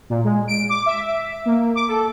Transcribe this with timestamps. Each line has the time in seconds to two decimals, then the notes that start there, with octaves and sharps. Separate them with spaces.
0.10 A#2
0.24 G#3
0.48 D7
0.69 D6
0.86 E5
1.46 A#3
1.75 D6
1.88 A4